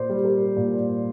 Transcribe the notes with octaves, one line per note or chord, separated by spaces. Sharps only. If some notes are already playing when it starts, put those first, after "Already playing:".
Already playing: A#2 C5 D5
G3
A#4
A#2